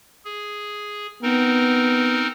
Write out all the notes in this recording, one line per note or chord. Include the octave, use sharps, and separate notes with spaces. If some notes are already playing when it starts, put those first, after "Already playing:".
G#4
B3 C4 D#4 A#4